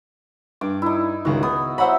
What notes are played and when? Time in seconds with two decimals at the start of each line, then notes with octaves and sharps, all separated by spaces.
0.61 G2 D6
0.82 D#4 E4
1.25 C#2 D#3 F#4
1.43 B3 D#6
1.78 F#3 C5 E5 F#5 B5